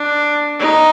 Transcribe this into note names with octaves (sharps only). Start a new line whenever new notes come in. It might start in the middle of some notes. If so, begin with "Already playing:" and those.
Already playing: D4
D#4